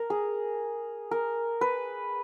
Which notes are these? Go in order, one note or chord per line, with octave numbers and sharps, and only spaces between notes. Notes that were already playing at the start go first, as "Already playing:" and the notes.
Already playing: A#4
G#4
A#4
B4